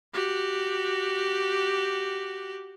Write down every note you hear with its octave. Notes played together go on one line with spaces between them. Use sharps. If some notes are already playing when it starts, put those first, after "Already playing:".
F#4 G4